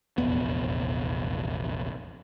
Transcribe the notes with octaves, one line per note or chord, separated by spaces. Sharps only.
F1 A#1 E2 B3